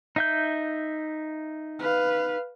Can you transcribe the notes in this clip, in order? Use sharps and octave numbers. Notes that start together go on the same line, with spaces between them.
D#4 E5 G6
B4 F5